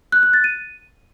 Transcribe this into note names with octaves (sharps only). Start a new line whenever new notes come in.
F#6
F#6
A6
D#7